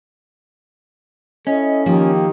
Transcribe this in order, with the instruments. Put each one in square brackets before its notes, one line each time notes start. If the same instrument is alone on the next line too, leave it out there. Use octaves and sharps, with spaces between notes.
[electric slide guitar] C#4 [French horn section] E4 A4 D#5
[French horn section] D#3 G4 [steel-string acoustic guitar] F3 A#3